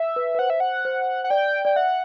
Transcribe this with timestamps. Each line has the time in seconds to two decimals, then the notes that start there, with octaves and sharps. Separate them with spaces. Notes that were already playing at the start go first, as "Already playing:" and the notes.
Already playing: E5
0.16 B4
0.35 B4
0.39 C5 F#5
0.50 E5
0.60 F#5
0.85 C5
1.24 F#5
1.30 D5 G5
1.65 D5 G5
1.76 E5 F#5